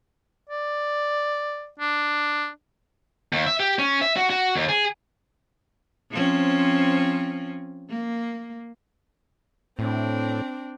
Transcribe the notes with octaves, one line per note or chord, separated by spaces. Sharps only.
D5
D4
D#2
E5
G4
C#4
E5
F#4
F#4
D#2
G#4
F3 C4 C#4
A#3
A2 C4 D4